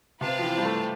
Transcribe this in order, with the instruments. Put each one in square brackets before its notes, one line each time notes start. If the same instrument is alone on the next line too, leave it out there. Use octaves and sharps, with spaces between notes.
[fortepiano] C3 [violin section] C4 F4 B4 F5 A5
[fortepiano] F3
E3
G3
A3